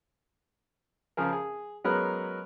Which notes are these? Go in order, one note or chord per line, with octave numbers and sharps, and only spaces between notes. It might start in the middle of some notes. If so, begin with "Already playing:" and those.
C#3 F3 G#4 A#4
G#4
F#3 G#3 B3 C#4 A#4 B4